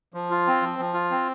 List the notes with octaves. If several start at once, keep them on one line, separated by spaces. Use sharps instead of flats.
F3
F4
C4
F3
F3
F4
C4